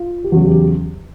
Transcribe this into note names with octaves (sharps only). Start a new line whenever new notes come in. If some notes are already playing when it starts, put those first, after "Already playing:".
Already playing: F4
G4
E2 C#3 F#3 F#4
G4